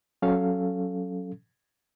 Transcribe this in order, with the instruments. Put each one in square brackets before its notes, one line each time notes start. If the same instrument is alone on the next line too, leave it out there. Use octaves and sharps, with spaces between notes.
[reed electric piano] F#3 C#4 A4 F5